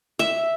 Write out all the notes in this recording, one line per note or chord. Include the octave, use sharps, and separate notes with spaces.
E5